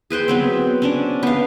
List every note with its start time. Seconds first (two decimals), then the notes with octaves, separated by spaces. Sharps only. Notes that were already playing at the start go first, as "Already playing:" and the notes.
0.10 G#4 B4 C5 G5
0.28 F#3 B3 C4
0.82 C#4 D4 D5
1.23 B3 F5